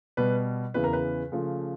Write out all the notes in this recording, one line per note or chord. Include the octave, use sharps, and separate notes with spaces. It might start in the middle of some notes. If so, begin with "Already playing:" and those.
B2 G3 B3 B4
E2 C#3 E3 B4
A#4
B4
C#3 F3 A3